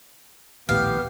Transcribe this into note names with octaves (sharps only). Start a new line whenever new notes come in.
D#1 A#1 A2 B3 G4 F5